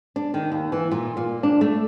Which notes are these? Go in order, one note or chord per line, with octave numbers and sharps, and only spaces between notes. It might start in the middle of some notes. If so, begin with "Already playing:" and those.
D4
D#3
D#2
E3
A#2
A#2
D4
A3